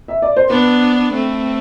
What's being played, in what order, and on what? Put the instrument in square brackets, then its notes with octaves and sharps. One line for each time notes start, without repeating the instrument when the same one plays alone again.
[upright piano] E5
D5
C5
[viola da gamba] B3 D4 [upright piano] B4
[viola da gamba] A3 C4